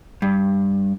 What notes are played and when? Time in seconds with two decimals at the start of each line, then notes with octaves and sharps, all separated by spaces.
0.22 G2